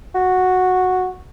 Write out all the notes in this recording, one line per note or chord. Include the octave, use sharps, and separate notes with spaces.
F#4